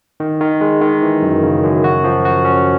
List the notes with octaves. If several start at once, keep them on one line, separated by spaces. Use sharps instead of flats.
D#3
D#3
G#3
D#3
E3
F#2
C#3
F#2
F#4
F3
F#4
C#4